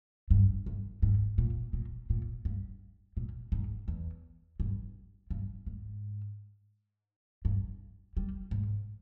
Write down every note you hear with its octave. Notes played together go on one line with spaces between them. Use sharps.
G2
G2
G#2
A#2
A#2
A#2
G2
A#2
G#2
E2
G2
G2
G#2
G2
G3
G#2